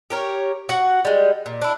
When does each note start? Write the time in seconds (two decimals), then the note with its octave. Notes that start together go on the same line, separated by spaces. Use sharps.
0.10 G4 A#4 C#5
0.69 F#4 F#5
1.05 G3 G#3
1.46 A#2
1.61 D4 E4